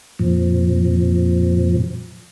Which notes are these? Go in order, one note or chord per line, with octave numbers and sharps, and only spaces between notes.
F2 A#2 F3